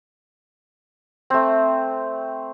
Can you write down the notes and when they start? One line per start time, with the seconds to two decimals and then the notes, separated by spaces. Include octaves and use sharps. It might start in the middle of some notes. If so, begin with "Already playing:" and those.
1.30 A3 C4